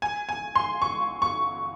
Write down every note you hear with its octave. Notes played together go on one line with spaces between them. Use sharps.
G#5
G#5
C6
C#6
C#6